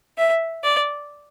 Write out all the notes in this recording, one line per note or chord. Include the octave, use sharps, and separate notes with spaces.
E5
D5